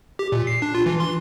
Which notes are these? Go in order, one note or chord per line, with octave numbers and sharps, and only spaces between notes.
G4
A#2
C7
D4
F4
E3
C6